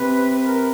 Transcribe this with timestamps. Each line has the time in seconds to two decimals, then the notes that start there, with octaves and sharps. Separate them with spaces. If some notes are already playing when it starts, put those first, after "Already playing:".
Already playing: C3 B4
0.44 A#4